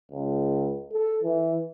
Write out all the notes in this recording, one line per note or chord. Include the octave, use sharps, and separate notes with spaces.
C#2
A4
E3